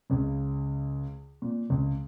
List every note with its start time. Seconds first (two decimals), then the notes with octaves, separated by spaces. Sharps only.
0.10 C#2 C#3
1.42 A#2
1.70 C#2 C#3